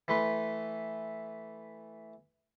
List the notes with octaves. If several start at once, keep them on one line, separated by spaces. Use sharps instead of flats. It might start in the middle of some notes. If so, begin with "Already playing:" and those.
E3 A3 B4 C6